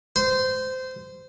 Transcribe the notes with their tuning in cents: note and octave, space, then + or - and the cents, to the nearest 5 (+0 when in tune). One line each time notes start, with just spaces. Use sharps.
C5 -20